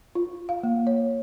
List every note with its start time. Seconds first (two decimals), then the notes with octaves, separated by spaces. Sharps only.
0.15 F4
0.49 F5
0.63 A#3
0.87 C#5